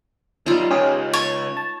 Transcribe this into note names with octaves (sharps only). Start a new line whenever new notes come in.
F#2 G3 D#4 F4
C#2 C#4 G4 G#4
C#5 A5
A5